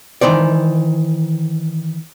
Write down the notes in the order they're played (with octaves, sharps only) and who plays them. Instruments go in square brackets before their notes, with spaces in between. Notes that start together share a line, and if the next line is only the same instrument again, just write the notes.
[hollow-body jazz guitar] D#3 E3 C5 D5